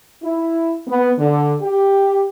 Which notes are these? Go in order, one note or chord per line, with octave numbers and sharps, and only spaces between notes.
E4
B3
D3
G4